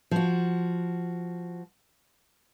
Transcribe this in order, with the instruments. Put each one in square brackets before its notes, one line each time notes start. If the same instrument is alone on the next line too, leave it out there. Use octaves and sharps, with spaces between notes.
[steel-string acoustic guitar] F3 F#4